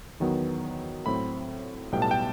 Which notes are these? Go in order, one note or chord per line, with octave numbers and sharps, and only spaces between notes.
E2 D#3 F#3 B3
A2 F#3 C4 B5
B1 A2 G3 B3 G5
A5
G5